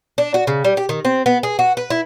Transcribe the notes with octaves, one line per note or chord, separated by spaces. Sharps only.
D4
F#4
C#3
G3
G4
D#3
C4
B3
G#4
F#4
B4
E4